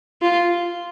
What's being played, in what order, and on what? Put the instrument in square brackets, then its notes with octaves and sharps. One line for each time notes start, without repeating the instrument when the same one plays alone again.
[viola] F4